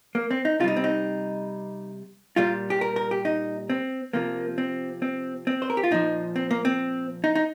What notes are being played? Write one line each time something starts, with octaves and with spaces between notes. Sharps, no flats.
A#3
C4
D#4
C3 G3 D#4 F4
C4
D#4
A#2 G3 F4
G4
A#4
A#4
G4
D#4
C4
C3 F3 A#3
C4
C4
C4
C5
A#4
G4
F4
A#2 F3 D#4
C4
A#3
C4
D#4
D#4